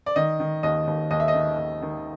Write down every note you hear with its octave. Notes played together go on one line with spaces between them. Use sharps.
D5
D#3 D#5
D#3
D#2 D#5
D#2
D#2 D#5
E5
D#5
D#3
D#2
D#3